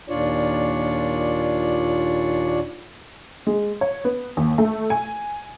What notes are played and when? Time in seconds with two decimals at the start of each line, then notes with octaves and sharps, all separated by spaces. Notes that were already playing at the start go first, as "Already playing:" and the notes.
0.09 D#2 A#2 D4 F4 C#5 D5
3.47 G#3
3.81 C#5
4.04 B3
4.37 D#2
4.58 A3
4.90 G#5